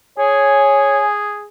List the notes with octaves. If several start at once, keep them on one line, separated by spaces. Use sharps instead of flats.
G#4 C#5 G#5